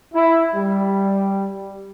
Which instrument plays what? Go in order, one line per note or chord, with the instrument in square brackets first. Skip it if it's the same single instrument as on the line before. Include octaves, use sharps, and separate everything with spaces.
[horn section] E4
G3